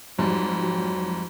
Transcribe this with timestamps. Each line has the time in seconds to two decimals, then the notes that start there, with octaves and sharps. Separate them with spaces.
0.19 F2 G#2 F#3 G3
0.61 F#3